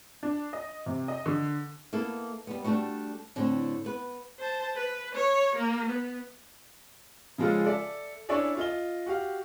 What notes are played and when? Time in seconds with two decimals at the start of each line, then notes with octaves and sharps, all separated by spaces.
0.23 D4
0.53 D#5
0.86 C3
1.08 D#5
1.26 D3
1.93 A#3 B3 E4 A4
2.47 G3 B3
2.64 G3 A3 D4 D#4 F#4
3.36 A2 D3 C4
3.84 B3 B4
4.39 C5 A5
4.76 B4
5.15 C#5
5.56 A#3
5.89 B3
7.38 C#3 F3 G#3 F4 A4
7.66 A4 D5 E5
8.29 C#4 D4 E4 A4 D5 C#6
8.57 F4 D#5 G7
9.06 F#4 G4 F5